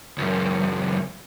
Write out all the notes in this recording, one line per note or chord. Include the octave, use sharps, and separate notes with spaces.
C#2 F#2